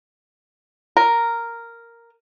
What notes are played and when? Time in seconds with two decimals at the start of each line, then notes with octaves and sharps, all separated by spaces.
0.97 A#4